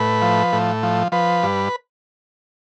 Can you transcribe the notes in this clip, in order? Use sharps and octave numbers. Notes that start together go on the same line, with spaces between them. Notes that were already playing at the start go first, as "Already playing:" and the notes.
Already playing: A2 B4
F3
A2
F3
F3 B4
G2